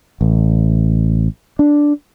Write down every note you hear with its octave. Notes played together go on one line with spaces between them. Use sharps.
A1
D4